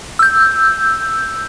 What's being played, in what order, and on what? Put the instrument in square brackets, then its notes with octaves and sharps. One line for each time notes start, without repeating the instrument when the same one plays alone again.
[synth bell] E6 G6